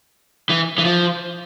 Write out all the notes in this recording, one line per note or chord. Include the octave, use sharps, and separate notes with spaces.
E3
E3
F3